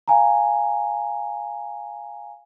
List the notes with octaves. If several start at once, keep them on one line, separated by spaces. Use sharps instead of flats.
F5 G#5 A#5